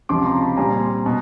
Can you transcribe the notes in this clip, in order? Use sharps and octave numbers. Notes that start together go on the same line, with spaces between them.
C#2 C3 F3 C6 D6
A#5 C6
A5 B5
A#2 G3 C4 G#5 A#5
B2